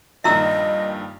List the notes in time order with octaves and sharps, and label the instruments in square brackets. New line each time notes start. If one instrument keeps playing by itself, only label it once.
[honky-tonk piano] A#1 G2 D#3 [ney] D#5 [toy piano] E5 A#5 E6